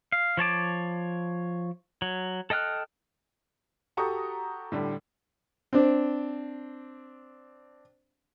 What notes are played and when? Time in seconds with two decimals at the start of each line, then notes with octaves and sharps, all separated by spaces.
0.12 F5
0.37 F3 C#5 A5 D6
2.02 F#3
2.50 A4 D#5 G5 F6 F#6
3.97 F#4 G4 A4 A#5 C#6 D#6
4.72 A2 D3 G3
5.73 C4 D4